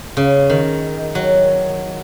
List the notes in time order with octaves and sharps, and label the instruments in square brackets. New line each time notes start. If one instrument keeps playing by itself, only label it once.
[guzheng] C#3
D#3
F#3